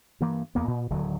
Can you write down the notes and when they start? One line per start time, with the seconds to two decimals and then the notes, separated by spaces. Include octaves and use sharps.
0.21 G2 E3 A#3
0.55 E2 A#3 B3
0.67 A#2
0.91 D1 D3 D#3 F#3